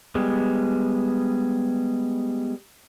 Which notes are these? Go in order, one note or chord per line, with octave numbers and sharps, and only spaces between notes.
G3 G#3 B3